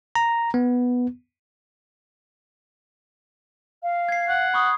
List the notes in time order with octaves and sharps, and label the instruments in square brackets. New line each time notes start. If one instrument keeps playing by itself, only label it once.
[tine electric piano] A#5
B3
[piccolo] F5
[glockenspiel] G#6 C7
[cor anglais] F#5
[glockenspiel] B5 C#6 D#6